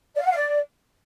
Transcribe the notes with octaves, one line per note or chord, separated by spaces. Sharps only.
D5
F5
F#5
F5
D5